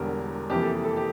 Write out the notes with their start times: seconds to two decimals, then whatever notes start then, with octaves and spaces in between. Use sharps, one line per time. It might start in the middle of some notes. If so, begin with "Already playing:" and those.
Already playing: E1 E2 D3 G3 A#4
0.50 F2 C3 E3 A#3 G4
0.62 A4
0.73 G4
0.84 A4
0.96 G4